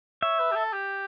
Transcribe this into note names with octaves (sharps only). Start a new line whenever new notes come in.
C#5 E5
B4
G4
A4
G4